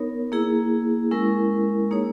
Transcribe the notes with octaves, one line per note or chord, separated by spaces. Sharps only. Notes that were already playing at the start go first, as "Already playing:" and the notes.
Already playing: B3 D#4 A#4 C#5
A#3 E4 G#4
G#3 C#4 E4 A#4
A#3 D#4 G#4 C#5